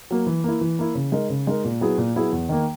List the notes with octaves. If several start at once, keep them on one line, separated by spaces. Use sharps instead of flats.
F#3 A#3
E3
A#3 E4
E3
A#3 E4
C#3
G#3 D#4 A#4
C#3
G#3 D#4 A#4
A#2
F#3 B3 E4 G#4
A#2
F#3 B3 E4 G#4
E2
D#3 A#3